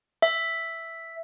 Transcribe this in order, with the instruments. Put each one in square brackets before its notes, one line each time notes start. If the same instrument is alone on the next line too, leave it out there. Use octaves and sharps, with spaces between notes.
[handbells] E5